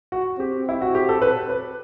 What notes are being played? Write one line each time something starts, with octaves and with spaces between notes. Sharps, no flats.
F#4
C4 G4
E4
F#4
G4
A4
B4
B4